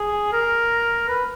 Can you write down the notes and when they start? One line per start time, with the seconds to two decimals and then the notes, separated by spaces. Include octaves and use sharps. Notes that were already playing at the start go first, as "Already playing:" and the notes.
Already playing: G#4
0.32 A#4
1.08 B4